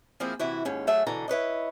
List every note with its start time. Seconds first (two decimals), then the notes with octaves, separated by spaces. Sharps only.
0.20 F3 A#3 C4 E4 G#4
0.39 C3 E3 E4 F#4
0.65 D#2 G#2 C#4
0.87 F#3 A3 G#4 E5
1.07 B2 D3 E3 A#5
1.28 E4 B4 C#5 D#5